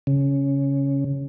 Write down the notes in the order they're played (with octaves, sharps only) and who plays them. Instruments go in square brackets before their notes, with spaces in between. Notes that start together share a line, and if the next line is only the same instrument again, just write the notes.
[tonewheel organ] C#3